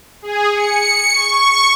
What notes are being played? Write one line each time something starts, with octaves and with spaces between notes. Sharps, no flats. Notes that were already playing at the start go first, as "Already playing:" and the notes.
G#4
C#7
C#6